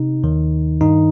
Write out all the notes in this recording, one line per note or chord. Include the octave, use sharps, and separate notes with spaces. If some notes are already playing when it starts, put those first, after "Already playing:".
Already playing: C3 D#4
D#2 D#3
G2 D#3 D#4